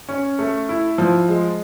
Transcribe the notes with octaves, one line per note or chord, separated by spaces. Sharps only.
C#4
A3
E4
F3
G#3